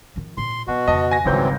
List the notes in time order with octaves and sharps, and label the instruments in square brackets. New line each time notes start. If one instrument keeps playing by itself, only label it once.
[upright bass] D#3 F3
[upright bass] A#2 [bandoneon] C6
[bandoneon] B2 F#4 [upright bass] F#3
[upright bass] F2 C#3 [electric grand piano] D#5 A5
[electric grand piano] G#5 A#6
[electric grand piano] G#1 C#2 G6 [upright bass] C#3 G3 [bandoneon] E3 F#3 C4